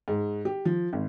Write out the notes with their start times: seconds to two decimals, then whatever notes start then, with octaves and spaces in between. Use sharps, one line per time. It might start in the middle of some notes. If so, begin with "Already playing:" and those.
0.08 G#2
0.45 G4
0.65 F3
0.93 G#1